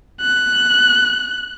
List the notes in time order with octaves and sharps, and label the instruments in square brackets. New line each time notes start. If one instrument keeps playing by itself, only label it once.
[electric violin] F#6